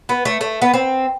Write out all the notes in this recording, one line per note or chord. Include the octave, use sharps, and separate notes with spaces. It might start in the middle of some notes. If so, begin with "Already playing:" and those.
B3
A3
A3
B3
C4